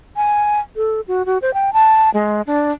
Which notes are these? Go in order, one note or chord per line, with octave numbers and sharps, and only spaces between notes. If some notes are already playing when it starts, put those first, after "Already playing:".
G#5
A4
F#4
F#4
C5
G5
A5
G#3
D4